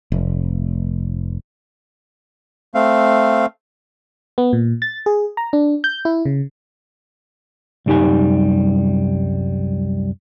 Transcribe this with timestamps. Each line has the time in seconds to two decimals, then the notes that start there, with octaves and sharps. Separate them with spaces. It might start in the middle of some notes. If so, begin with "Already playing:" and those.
0.12 F1
2.75 A3 C4 F5
4.38 B3
4.53 A#2
4.82 A6
5.06 G#4
5.37 A#5
5.53 D4
5.84 G6
6.05 E4
6.25 C#3
7.86 C2 F#2 G3 D#4 G4 G#5